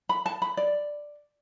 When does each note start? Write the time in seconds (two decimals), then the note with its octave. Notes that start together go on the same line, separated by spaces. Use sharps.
0.09 B5
0.26 A5
0.42 B5
0.57 D5